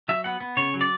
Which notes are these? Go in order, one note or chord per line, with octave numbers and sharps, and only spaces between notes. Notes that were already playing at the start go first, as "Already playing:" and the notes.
F#3 E5
B3 F#5
B3
C#3 C#5
F#3
D5